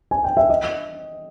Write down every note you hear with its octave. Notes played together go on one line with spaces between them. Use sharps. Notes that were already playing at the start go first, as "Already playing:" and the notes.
G#5
G5
E5
D#5